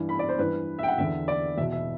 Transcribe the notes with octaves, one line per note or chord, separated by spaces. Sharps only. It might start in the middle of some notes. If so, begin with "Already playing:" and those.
Already playing: G2 E3
B5
D5
C5
G2 E3 B4
E5
G5
F#5
E2 D3 E5
D5
E2 B2 E5
E5